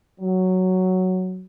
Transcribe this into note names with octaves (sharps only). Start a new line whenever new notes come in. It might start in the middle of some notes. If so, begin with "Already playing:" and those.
F#3